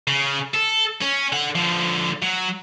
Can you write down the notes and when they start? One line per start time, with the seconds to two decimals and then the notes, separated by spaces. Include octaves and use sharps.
0.07 C#3
0.54 A4
1.02 C#4
1.32 D3 F#5
1.55 D3 F3
2.22 F#3